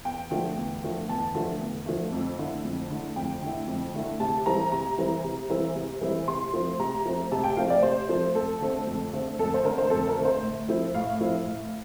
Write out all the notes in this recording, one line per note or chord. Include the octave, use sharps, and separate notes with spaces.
E2 G5
D3 F3 A3
E2
D3 F3 A3
E2 A5
D3 F3 A3
E2
D3 F3 A3
F2
D3 A3 E4
F2
D3 A3 E4
F2 G5
D3 A3 E4
F2
D3 A3 E4
C3 A5
E3 G3 C4 E4 A#5
C3 A#5
E3 G3 C4 E4
C3
E3 G3 C4 E4
C3
E3 G3 C4 E4
C3 C6
F3 A3 C4
C3 A#5
F3 A3 C4
C3 A5
G5
F3 A3 C4 F5
D5
C3 C5
F3 A3 C4
F2 A4
D3 A3 C4
F2
D3 A3 C4
F2 A4
C5
D3 A3 C4 A#4
C5
F2 A4
A#4
D3 A3 C4
C5
A2
F3 C4 E4
A2 F5
F3 C4 E4
A2